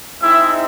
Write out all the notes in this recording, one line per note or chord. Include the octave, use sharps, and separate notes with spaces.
G#3 C4 D#4 E4 E5